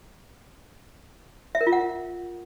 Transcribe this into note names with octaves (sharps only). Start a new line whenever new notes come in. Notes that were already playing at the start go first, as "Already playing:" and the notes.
E5
A#4
F4
F#5